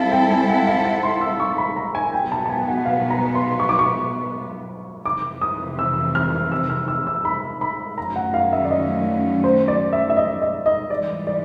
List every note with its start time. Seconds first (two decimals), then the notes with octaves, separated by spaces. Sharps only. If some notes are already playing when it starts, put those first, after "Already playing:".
Already playing: G3 C4 E4 A4 F5
0.11 G5
0.30 G#5
0.48 F#5
0.67 F5
0.85 F#5
1.03 C6
1.21 E6
1.40 C#6
1.58 B5
1.76 A#5
1.95 G#5
2.13 B2 F#3 B3 G5
2.32 A5
2.46 A5
2.50 G#5
2.68 F#5
2.85 F5
3.10 A#5
3.35 C6
3.60 C#6
3.69 D6
3.79 C#6
5.05 F2 C3 E3 D6
5.41 D#6
5.79 E6
6.15 F6
6.52 E6
6.70 F6
6.88 E6
7.07 E6
7.25 B5
7.61 B5
7.97 F#2 D#3 F#3 A3 C#4 A#5
8.16 F#5
8.34 F5
8.53 E5
8.65 D5
8.71 D#5
9.44 C5
9.68 D5
9.93 E5
10.10 E5
10.17 D#5
10.41 D#5
10.66 D#5
10.90 G#2 E3 G3 D5
11.27 D5